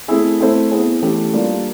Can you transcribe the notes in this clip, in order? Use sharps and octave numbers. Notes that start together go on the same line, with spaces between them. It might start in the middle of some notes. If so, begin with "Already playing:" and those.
A3 C4 E4 G#4
A3 C4 E4 A4 C5
B3 E4 G#4 C5
E3 A3 C#4 E4 G4
G3 A#3 D4 F4 A4